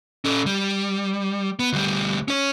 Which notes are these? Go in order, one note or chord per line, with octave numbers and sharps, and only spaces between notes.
C#4 A4
G3
B3
D2 G3
C#4 C#5